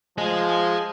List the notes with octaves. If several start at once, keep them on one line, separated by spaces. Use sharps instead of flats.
F3 G#4 D#5